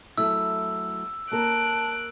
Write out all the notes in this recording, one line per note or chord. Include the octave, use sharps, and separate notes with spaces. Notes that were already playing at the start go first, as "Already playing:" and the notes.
F#3 A3 E4 E6
A#3 A#4 A5 F#6 D7